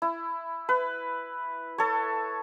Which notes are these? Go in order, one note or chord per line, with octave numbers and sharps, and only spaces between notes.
E4
B4
A4 C#5